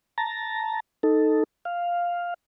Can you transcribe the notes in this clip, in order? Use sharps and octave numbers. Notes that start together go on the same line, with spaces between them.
A5 A#5
D#4 A4
F5